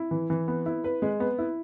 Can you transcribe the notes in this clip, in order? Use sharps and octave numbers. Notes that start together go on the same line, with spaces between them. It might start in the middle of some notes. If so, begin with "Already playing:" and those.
Already playing: E4
E3
E3
B3
E4
B4
G#3
B3
E4